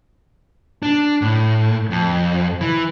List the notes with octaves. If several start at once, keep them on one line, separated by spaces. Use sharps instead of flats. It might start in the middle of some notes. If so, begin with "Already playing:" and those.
D4
A2
F2
E3